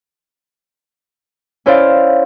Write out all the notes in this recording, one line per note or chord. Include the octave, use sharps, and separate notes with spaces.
C#4 E4 C5 D5 F5